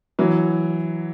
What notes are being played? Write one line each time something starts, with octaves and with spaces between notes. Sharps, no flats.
E3 F#3